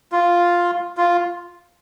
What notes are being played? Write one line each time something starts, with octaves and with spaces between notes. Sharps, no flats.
F4
F4